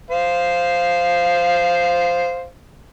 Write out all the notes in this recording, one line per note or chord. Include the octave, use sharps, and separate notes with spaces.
C5 F5